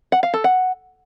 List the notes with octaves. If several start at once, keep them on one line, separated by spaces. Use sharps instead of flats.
F#5
F5
A4
F#5